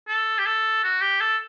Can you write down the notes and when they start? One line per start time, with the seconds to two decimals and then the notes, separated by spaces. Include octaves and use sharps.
0.08 A4
0.38 G4
0.46 A4
0.84 F#4
1.02 G4
1.20 A4